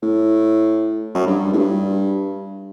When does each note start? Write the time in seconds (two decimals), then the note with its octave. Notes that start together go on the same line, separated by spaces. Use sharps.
0.02 A2
1.15 F#2
1.27 G2
1.53 A2
1.58 G2